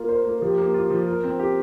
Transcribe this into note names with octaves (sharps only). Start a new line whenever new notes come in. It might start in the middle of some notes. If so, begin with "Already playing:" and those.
Already playing: A#3 F4 A#4
C5
A#3
A#4
F3 G4
A#3
F4
F3
F4 A#4
C4
G4